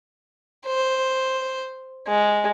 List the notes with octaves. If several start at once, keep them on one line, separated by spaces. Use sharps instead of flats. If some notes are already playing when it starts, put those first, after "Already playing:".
C5
G#3